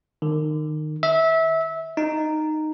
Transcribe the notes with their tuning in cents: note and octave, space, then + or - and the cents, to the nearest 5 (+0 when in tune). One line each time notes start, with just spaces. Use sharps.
D#3 -25
E5 -20
D#4 -10